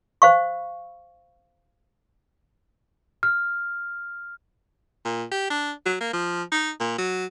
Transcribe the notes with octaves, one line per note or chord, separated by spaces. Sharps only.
C5 F5 C#6
F6
A#2
G4
D4
F#3
A#3
F3
D#4
A#2
F#3